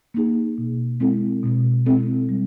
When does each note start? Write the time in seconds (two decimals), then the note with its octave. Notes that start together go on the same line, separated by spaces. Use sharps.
0.14 A#3 D#4 G#4
0.58 B2
1.00 G#3 C4 E4 A4
1.43 B2
1.85 G#3 C4 E4 A4
2.29 G3